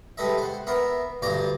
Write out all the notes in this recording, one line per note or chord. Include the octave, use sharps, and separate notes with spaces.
G3 G#3 A4 B4 D#5 E5
C5 F#5
B3 A#4 E5 C6
D2 G2 C5 D5 A#5 D6